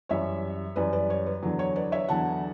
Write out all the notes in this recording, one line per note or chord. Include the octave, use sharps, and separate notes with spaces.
F#2 E3 G3 C#5 E5
F#2 E3 G3 B4 D5
B4 D5
C#5
B4
E2 D3 F#3
C#5
B4 D5
C#5 E5
E2 D3 F#3 F#5 A5